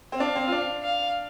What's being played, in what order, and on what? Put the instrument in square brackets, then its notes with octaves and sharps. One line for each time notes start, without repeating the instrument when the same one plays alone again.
[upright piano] C4
[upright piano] D4 [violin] F5
[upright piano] C4
F4
D4
[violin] F5